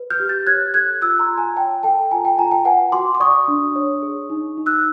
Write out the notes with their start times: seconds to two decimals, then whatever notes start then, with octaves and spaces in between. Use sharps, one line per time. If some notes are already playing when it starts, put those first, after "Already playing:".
Already playing: B4
0.10 F6 G6
0.20 G4
0.29 G6 A6
0.47 C#5 F#6 G#6
0.74 A4 F#6 G#6
1.02 F4 E6 F#6
1.19 A#5 C6
1.28 F4
1.37 G#5 A#5
1.57 C#5 G5 A5
1.83 A4 G5 A5
2.11 F4 G#5 A#5
2.25 G5 A5
2.38 F4 G#5 A#5
2.51 G5 A5
2.65 B4 F#5 G#5
2.92 F#4 C6 D6
3.15 D6
3.20 D5 C#6 D#6
3.48 D4
3.76 C#5
4.02 G#4
4.30 D#4
4.57 D#4
4.66 E6 F#6